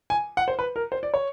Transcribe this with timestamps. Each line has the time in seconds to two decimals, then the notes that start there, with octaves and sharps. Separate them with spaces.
0.10 G#5
0.37 F#5
0.48 C5
0.59 B4
0.76 A#4
0.92 C5
1.03 D5
1.14 C#5